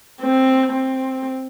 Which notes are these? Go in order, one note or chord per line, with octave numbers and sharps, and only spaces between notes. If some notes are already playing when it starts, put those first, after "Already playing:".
C4
C4